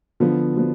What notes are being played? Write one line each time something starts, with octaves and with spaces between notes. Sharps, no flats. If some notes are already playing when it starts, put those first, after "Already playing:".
D3 F3 B3 F4
D3 F3 B3